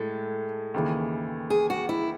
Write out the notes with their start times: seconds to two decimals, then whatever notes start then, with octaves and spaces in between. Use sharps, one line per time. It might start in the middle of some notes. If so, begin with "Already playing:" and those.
Already playing: A2 G#3 A4
0.74 D#2 C#3 E3
1.50 G#4
1.70 F#4
1.89 E4